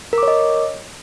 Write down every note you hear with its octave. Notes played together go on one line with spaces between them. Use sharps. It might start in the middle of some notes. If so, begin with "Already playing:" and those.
A#4 C#5 D#5 D6